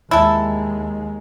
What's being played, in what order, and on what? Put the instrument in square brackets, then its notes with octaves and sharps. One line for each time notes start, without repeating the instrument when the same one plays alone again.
[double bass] D#2 G#3 [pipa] E4 A4